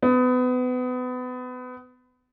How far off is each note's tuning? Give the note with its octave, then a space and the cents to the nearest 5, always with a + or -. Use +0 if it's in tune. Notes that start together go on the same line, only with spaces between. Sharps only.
B3 +30